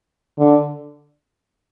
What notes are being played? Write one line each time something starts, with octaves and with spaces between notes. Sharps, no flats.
D3